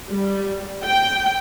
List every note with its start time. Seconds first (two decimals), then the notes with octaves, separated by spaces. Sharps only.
0.11 G3
0.85 G5